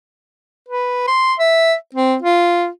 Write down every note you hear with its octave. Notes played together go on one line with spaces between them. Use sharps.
B4
C6
E5
C4
F4